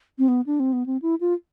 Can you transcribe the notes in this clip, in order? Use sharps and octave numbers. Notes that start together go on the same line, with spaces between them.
C4
B3
D4
C4
B3
C4
E4
F4